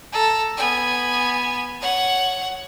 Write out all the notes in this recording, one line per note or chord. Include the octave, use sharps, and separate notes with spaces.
A4 A#5
B3 G#5
C#5 F#5